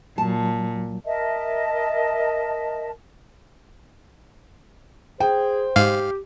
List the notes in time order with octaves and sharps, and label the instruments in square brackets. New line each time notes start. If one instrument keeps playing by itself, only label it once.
[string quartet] A#2 [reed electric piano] F#3 [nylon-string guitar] A5
[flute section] A#4 D#5 E5 A5
[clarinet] G#4 [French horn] C5 [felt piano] G5
[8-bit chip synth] G#2 F5 [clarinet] G4